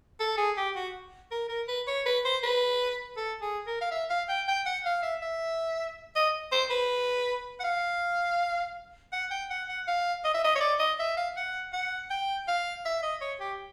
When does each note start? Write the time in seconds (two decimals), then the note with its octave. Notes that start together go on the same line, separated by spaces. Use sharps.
0.20 A4
0.38 G#4
0.57 G4
0.75 F#4
1.31 A#4
1.49 A#4
1.68 B4
1.87 C#5
2.06 B4
2.25 C5
2.43 B4
3.17 A4
3.41 G#4
3.67 A#4
3.81 F5
3.91 E5
4.10 F5
4.29 G5
4.48 G5
4.66 F#5
4.85 F5
5.03 E5
5.22 E5
6.15 D#5
6.52 C5
6.70 B4
7.60 F#5
7.64 F5
9.12 F#5
9.31 G5
9.50 F#5
9.69 F#5
9.88 F5
10.25 D#5
10.34 E5
10.44 D#5
10.55 C#5
10.61 D5
10.79 D#5
10.99 E5
11.17 F5
11.36 F#5
11.73 F#5
12.10 G5
12.48 F5
12.85 E5
13.03 D#5
13.22 C#5
13.40 G4